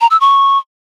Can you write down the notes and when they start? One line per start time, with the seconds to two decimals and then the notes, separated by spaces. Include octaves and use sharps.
0.01 A#5
0.11 E6
0.21 C#6